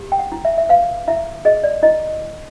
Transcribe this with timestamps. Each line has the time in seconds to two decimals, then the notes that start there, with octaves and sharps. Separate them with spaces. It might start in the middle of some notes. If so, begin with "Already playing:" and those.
Already playing: G4
0.12 G5
0.19 F#5
0.32 E4
0.45 E5
0.58 E5
0.69 B4 F5
1.08 E4 E5
1.45 G#4 D#5
1.64 D5
1.83 E4 D#5